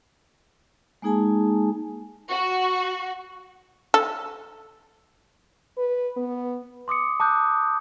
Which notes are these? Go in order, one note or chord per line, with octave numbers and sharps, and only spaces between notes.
G#3 A#3 D#4 G#4 G#5 A5
F#4
A4
B4
B3
C6 D6 D#6 C#7
A5 D6 D#6 F#6 G6